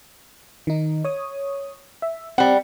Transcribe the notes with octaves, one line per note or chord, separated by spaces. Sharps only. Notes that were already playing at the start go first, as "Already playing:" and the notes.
D#3 D#4
C#5 D#6
E5
G3 C4 F#5